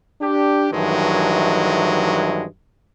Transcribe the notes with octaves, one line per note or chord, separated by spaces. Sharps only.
D4 G4
G2 D#3 E3 F#3 G#3 A3